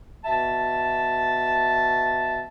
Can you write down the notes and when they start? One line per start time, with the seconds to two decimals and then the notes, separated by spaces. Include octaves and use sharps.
0.25 B2 E5 A5